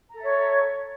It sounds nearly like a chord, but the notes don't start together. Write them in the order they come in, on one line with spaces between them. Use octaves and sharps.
A#5 A4 E5 C#5